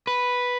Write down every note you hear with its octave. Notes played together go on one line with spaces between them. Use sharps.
B4